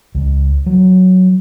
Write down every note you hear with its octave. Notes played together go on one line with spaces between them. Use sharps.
C#2
F#3